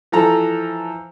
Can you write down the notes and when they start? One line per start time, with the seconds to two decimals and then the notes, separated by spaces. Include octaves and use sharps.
0.12 E3 F3 A4 A#5